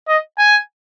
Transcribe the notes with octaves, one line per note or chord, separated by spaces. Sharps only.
D#5
G#5